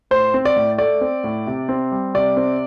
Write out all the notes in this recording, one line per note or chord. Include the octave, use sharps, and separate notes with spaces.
A2 C5
C4
D5
A2
A3 D5
C4
A2
C3
C4
G3
C3 D5
C4